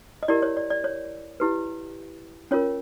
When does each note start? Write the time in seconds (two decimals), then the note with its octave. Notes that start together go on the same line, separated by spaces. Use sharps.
0.23 D#5
0.28 E4 G4 A#4 D5
0.42 C#5
0.57 D5
0.70 D5
0.84 C#5
1.40 E4 G4 B4
2.51 C#4 F4 A#4 C#5